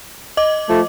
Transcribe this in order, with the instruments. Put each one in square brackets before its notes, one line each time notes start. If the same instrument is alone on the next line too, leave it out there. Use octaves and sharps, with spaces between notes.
[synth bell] D#5 D6
[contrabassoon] F3 [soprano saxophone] A3